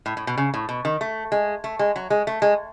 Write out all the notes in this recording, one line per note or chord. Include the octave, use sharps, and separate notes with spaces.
A2
A2
B2
C#3
A2
B2
D#3
A3
G#3
A3
G#3
F#3
G#3
A3
G#3